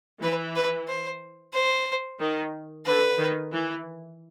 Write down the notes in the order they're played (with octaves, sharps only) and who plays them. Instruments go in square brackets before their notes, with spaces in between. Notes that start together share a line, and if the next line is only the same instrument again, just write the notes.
[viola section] E3 [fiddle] B4
[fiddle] B4
C5
C5
[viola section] D#3
[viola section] D3 [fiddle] B4
[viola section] D#3
E3